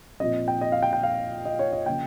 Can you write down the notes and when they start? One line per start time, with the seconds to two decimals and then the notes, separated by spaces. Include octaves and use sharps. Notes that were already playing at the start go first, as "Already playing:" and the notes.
0.20 A#2 F3 C4 D#5
0.48 G5
0.61 D#5
0.72 F5
0.83 G5
0.93 G5
1.03 F5
1.45 D#5
1.59 C#5
1.73 D#5
1.86 C#3 F3 A#3 G5